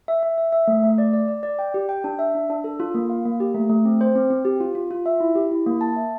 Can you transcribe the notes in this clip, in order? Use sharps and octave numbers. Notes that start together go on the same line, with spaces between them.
E5
E5
E5
E5
A3
A3
D5
D5
D5
D5
G5
G4
G5
D4
E5
D4
D4
A4
F4
A#3
F5
A#3
G4
A3
A3
C4
C5
C4
C4
G4
F4
F4
F4
E5
E4
G4
E4
A#3
A5
E5